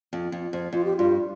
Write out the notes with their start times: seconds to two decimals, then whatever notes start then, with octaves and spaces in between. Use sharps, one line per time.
0.13 F2
0.32 F2
0.53 F2
0.72 F2 F4
0.85 G4
0.97 G2 F4